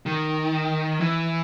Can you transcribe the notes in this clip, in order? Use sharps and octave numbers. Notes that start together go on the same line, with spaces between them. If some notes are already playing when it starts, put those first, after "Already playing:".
D#3
E3